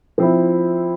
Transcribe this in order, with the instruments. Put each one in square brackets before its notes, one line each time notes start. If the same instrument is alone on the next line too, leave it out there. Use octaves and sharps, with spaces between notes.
[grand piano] F3 C4 E4